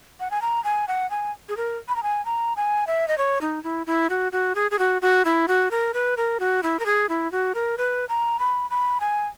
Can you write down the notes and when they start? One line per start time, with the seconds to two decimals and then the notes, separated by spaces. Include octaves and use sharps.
0.20 F#5
0.31 G#5
0.42 A#5
0.64 G#5
0.88 F#5
1.11 G#5
1.49 G#4
1.57 A#4
1.88 B5
1.96 A#5
2.03 G#5
2.25 A#5
2.57 G#5
2.87 E5
3.08 D#5
3.18 C#5
3.41 D#4
3.64 E4
3.87 E4
4.10 F#4
4.32 F#4
4.55 G#4
4.71 G#4
4.79 F#4
5.02 F#4
5.25 E4
5.48 F#4
5.71 A#4
5.94 B4
6.17 A#4
6.40 F#4
6.63 E4
6.80 A#4
6.86 G#4
7.09 E4
7.32 F#4
7.55 A#4
7.78 B4
8.09 A#5
8.39 B5
8.70 B5
9.00 G#5